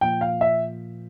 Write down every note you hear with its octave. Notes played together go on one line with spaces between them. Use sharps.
A#2 F3 G5
F5
E5